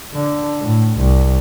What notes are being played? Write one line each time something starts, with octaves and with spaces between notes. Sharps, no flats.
D3
A2
C2